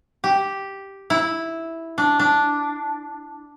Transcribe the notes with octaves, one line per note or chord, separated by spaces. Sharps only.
G4
E4
D4
D4